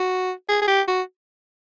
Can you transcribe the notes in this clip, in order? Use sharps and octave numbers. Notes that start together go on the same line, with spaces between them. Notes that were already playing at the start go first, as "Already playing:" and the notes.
Already playing: F#4
G#4
G#4
G4
F#4